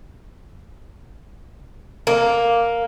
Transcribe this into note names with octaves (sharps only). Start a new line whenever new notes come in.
A#3